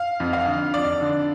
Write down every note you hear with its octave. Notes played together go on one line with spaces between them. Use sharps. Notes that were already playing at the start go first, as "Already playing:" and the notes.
Already playing: F5
F2
F5
D3
F2 D5
D3